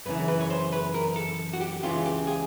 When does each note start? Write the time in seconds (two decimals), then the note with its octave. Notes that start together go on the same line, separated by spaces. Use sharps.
0.06 F#2 C#3 E3 B4
0.28 B4
0.41 C#5
0.50 C5
0.72 B4
0.94 A#4
1.16 A4
1.53 F#4
1.61 G4
1.83 C#2 C#3 E3 F4
2.06 G4
2.27 G#4